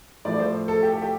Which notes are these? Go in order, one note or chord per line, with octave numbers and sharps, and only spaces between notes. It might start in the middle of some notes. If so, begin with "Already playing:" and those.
A2 F3 D5
C5
A4
G4
A4
G4